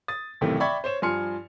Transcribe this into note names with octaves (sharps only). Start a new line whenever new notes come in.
D#6 A6
B1 A2 C3 D#3 E3 A3
D5 E5 G5 B5 C#6 G#6
C5 C#5 E7
G2 F3 G#5 C6 F6 C#7